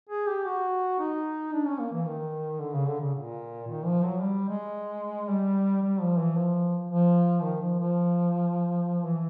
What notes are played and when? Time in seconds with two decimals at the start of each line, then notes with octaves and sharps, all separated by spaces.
0.09 G#4
0.27 G4
0.45 F#4
0.99 D#4
1.53 D4
1.67 C#4
1.80 A#3
1.93 E3
2.06 D#3
2.60 D3
2.73 C#3
2.88 D3
3.00 C#3
3.14 A#2
3.68 D#3
3.86 F3
4.03 F#3
4.21 G3
4.49 G#3
5.29 G3
5.82 G3
6.01 F3
6.19 E3
6.37 F3
6.90 F3
7.43 D#3
7.62 F3
7.79 F3
9.05 E3